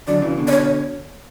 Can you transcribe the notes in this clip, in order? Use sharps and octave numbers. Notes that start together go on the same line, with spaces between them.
D3 F#3 D5
C#3 E3
B2 D3
D5
C#5